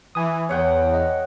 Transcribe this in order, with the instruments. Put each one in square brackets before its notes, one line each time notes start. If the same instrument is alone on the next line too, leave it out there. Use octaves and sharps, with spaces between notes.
[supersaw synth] E3 [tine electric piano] G#5 D#6
[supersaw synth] E2 [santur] C#5 F#5 G5
[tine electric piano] D#5